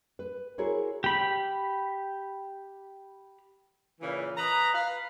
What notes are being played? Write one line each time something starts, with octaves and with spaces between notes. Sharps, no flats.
B4
E4 F#4 G#4 A#4 C5 C#5
G4 B5
A#2 C#3 E3
B4 D#5 A#5
B4 F5